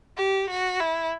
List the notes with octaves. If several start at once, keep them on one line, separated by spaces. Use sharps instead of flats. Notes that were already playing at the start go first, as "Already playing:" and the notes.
G4
F#4
E4